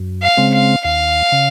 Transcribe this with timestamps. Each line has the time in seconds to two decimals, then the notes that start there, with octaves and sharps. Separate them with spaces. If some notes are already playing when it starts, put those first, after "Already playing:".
Already playing: F#2
0.22 F5
0.37 C#3 G#3 C4
0.54 F5
0.85 D#2 F5
1.32 C#3